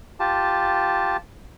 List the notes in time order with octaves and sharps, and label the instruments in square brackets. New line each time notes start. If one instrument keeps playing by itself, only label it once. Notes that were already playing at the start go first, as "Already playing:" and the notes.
[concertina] F4 G4 A5